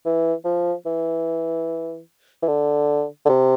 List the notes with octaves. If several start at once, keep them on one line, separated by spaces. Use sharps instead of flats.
E3
F3
E3
E3
D3
D3
C3